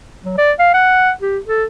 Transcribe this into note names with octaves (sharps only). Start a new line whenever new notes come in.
F#3
D5
F5
F#5
G4
A4